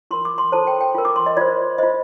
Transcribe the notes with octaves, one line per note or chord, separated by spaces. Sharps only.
F4 A#4 C6
D6
C6
F4 A4 C5 A5
G5
G5
F4 A#4
D6
C6
D#5
F4 C5 D5
F4 C5 D#5